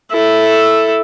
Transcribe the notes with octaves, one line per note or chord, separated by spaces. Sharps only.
E4 A4